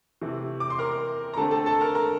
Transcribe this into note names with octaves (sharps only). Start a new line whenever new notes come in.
C3 E3 A3
D6
C6
A#4 A#5
A#5
D3 A3 C4 A4 A5
A4 A5
A4 A5
A#4 A#5
A#4 A#5